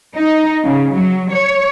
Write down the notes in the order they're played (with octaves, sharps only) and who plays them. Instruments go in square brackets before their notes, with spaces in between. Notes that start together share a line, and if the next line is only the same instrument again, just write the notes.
[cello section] D#4
C#3
F#3
C#5